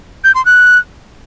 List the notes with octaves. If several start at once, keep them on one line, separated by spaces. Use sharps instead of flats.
G6
C6
F#6